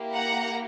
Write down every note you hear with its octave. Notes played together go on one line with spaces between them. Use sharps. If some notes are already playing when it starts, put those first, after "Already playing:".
Already playing: A#3 E4 G4
F#5 A#5